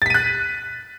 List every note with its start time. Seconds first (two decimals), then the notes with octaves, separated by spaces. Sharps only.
0.02 A6
0.06 B6
0.10 D#7
0.14 F#6